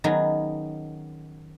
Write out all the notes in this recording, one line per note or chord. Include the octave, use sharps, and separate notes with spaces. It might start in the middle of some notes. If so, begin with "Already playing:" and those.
D#3 F#3 B3 C#4 G#4